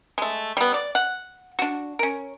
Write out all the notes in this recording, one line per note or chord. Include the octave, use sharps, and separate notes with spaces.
G#3 A3
G3 B3
D5
F#5
D4 F#4
C#4 A#4